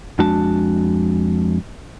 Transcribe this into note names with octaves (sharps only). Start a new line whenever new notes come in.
F2 G#3 D4 F#4 A5